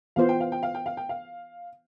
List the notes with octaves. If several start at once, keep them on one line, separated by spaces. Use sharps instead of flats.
E3 B3 F4 C5 F5
G5
F5
G5
F5
G5
F5
G5
F5